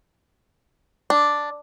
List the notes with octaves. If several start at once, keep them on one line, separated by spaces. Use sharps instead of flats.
D4